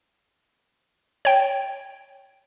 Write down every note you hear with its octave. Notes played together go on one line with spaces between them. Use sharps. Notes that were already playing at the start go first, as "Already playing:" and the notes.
C#5 G5